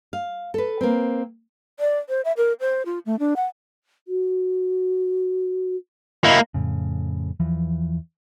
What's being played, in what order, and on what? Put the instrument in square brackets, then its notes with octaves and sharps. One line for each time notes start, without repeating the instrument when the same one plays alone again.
[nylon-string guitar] F5
A4 B4
A#3 C4
[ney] D5
C5
E5
A#4
C5
F4
A3
D4
F#5
[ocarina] F#4
[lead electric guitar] A#3 E4 [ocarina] D#5
[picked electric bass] F2 A2 C#3
E2 E3 F3